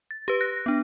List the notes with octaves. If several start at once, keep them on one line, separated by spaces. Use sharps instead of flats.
A6
G4 B4
F#6 A#6
B3 D4